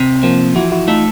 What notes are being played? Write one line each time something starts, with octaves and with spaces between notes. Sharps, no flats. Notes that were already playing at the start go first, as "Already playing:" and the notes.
Already playing: C3
F3 A#3 C4
E3 E4 F#4
E4 F#4
A3 D#4 F4